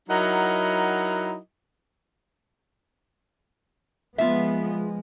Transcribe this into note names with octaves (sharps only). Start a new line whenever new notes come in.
F#3 D#4 E4 A#4 D#5 F#5
F3 G#3 B3 F4 E5